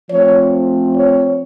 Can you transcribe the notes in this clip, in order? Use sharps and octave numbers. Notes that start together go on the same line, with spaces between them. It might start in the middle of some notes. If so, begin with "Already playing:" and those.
F3 A3 C4 C#5
C#5